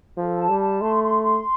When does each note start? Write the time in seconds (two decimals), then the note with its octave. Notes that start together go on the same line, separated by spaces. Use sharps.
0.16 F3 A4
0.38 A5
0.49 G3
0.59 A5
0.81 A3 C6
1.02 C6
1.24 C6